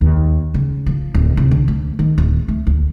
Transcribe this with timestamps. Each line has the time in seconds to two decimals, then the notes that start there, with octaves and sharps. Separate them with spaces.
0.01 D#2
0.54 C#3
0.86 F3
1.14 D1
1.37 C2
1.51 D3
1.68 D2
1.99 D#3
2.18 D1
2.48 A3
2.67 D2